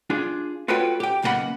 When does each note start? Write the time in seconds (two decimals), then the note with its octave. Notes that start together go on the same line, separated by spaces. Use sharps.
0.10 D4 F4 G#4
0.68 F4 F#4 A4 B4 C#5 G5
1.00 G4 G5
1.22 B1 C#3 A#3 E4 F#5 B5